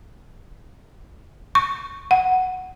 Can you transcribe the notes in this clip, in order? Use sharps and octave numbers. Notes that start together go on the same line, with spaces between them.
C#6
F#5